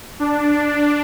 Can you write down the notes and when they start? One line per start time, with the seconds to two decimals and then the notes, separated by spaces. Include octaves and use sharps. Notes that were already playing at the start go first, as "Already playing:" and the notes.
0.20 D4